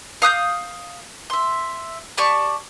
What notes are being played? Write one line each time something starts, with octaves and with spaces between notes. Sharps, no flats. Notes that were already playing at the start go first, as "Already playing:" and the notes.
F5 D#6 F#6 G6
E5 C6
G4 D5 A5 C#6